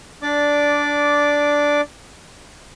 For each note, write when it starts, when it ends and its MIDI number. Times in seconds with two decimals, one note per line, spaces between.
0.22 1.81 62
0.22 1.81 74
0.22 1.81 86